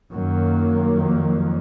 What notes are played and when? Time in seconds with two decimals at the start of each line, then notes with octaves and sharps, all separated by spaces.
0.11 F#2 D#3 F#3 A#3
0.95 F2